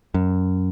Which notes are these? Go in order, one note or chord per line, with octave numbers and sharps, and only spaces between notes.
F#2